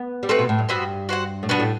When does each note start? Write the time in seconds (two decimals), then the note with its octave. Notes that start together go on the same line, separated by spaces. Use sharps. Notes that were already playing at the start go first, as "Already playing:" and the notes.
Already playing: B3
0.23 G3
0.29 A3 C4 F#4 B4
0.39 B2
0.49 A2
0.59 G2
0.69 G2 B3 F#4 C5 E5
1.09 F#4 C5 F#5
1.43 A2
1.49 B2 B3 D4 F#4
1.60 A2